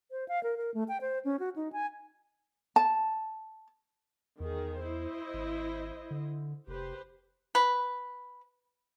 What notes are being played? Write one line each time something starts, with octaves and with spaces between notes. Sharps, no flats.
C5
F5
A#4
A#4
A3
G5
C5
C#4
F#4
D#4
G#5
A5
E2 D#3 G#4
E4 C5 D#5
G#1
D3
F1 G4 B4 C5
B4